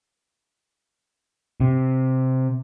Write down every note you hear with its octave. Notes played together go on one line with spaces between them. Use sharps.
C3